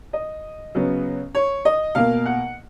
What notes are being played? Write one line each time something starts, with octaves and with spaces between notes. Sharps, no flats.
D#5
C#3 F#3 B3
C#5
D#5
B2 A#3 F5
F#5